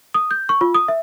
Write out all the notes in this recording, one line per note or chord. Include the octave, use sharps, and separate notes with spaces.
D#6
G6
C#6
F4
D#6
E5